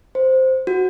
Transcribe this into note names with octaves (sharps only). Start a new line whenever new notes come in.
C5
F#4